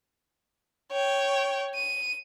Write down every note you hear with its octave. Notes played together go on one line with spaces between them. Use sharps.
C#5 G5
D#7